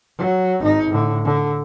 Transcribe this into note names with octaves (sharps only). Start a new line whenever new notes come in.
F#3
G#1 D#4
A2 D3
D3